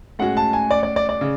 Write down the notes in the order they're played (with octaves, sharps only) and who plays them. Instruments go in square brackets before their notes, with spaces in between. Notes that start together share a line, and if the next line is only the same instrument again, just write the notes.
[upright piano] A2 G#3 C#4 F#4 [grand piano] F#5
[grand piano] A5
G#5
D5
D5
D5
D5
[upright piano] C#3